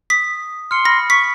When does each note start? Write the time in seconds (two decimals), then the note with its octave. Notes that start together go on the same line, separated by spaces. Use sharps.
0.10 D#6 B6
0.71 C6 F6 C#7
0.85 B5 F6 A#6
1.10 C#6 B6